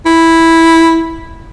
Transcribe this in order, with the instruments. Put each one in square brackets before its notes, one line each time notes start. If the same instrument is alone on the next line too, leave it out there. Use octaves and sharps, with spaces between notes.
[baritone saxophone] E4